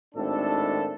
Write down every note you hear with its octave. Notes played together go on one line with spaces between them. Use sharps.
G#1 A2 D4 A4